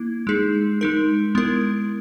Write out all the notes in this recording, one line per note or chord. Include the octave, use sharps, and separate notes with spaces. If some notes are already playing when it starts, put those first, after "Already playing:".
Already playing: A#3 E4
G#3 D#4 G#4
G#3 D#4 A#4
G#3 B3 E4 A#4